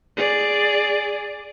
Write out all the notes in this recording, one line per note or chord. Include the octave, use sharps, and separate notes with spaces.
G#4 D5